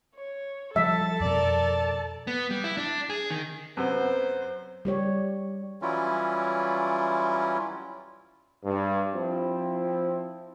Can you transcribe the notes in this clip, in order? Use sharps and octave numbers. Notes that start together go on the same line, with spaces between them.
C#5
F3 G3 A4 E5 A5
F2 B2 A#4 D5
B3
G3
E4
D4
G#4
D#3
F#2 C3 B3 C5
G3 G4 C#5
E3 F#3 G3 C#4 E4 F4
G2
F3 C4 E4